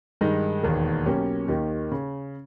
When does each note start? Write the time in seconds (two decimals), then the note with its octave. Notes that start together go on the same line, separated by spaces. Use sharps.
0.21 G2 D#3 G#3 D#4
0.63 E1 D#2 D#3 A#3
1.06 B1 B2 A#3 C#4 G4
1.48 D#2 D#3 A#3 D#4 G4
1.91 C#3